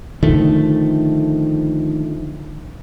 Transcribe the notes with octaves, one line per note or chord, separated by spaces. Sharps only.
D3 D#3 F3 A3